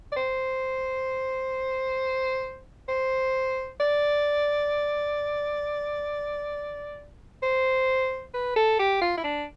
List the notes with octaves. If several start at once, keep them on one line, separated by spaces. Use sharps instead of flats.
D5
C5
C5
D5
C5
B4
A4
G4
F4
E4
D4